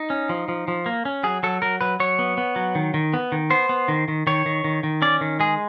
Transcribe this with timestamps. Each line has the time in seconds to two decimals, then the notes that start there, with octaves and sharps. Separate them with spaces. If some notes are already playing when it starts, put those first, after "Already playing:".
Already playing: D#4
0.10 C#4
0.29 F3
0.48 F3
0.68 F3
0.86 A#3
1.05 C#4
1.23 F#3 G#4
1.43 F#3 A4
1.62 F#3 A#4
1.81 F#3 B4
2.00 F#3 C#5
2.19 B3
2.38 B3
2.56 F#3
2.75 D#3
2.94 D#3
3.14 B3
3.32 D#3
3.50 B3 C5
3.69 B3
3.88 D#3
4.08 D#3
4.27 D#3 C#5
4.46 D#3
4.64 D#3
4.83 D#3
5.02 C#4 D5
5.21 D#3
5.40 G#3 G#4